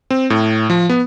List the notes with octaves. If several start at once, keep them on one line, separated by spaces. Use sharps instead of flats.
C4
A2
F3
B3